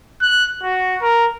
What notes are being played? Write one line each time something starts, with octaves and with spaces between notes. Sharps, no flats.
F#6
F#4
A#4